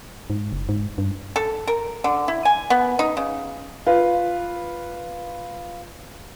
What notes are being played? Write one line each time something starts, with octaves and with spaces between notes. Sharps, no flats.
G#2
F#1
G#2
G2
A4
A#4
D3
E4
G#5
B3
D#4
C#3
F4 B4